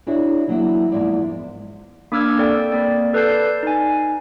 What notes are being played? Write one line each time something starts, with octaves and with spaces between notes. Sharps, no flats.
D4 E4 F#4 G#4 C#5 D5
E3 F#3 A#3 E4
E2 G#2 F3 A#3 E4 D5
A#3 D4 D6 E6 F6 G#6
C4 A4 D5 G5
A#3 D5
A4 B4 D5 A5 G6 C7
D#4 G#5